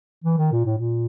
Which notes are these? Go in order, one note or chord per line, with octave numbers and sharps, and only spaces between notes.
E3
D#3
A#2
A2
A#2